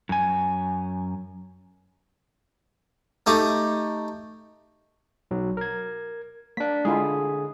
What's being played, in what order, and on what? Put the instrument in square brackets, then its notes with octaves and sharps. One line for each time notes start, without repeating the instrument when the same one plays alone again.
[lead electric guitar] F#2 G#5
[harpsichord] A3 D#4 G4
[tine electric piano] B1 F#3
A#4 G#6
[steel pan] A#3 [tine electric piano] D4 B6
[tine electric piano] D3 G#4 [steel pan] G#3 E4 F4